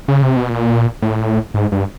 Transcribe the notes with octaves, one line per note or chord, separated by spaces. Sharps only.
C#3
C3
B2
A#2
A2
G#2
G2